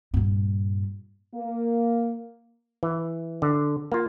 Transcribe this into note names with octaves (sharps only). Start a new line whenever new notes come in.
G2 A#2
A#3
E3
D3
A#3 F4